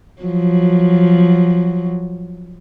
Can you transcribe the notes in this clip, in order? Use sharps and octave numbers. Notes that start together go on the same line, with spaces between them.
F3 F#3